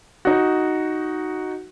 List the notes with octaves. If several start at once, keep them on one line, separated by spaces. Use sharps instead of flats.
D#4 F#4